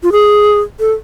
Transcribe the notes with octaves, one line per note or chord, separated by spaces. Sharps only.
F4
G#4
A4